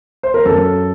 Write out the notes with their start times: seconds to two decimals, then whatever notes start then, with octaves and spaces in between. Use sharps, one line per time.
0.23 C5
0.34 A#4
0.46 F#2 A4